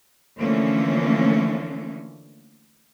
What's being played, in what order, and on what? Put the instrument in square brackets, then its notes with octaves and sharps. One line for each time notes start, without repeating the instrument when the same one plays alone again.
[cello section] D3 E3 F3 A3 A#3 C#4